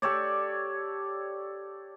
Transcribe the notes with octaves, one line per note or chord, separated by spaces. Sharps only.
G4 A4 C#5 D5